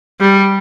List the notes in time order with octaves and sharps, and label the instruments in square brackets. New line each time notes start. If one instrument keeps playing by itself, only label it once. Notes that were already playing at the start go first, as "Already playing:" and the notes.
[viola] G3